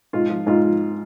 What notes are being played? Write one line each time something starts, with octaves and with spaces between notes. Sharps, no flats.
G#2 F4
F3
G#2 F4
F3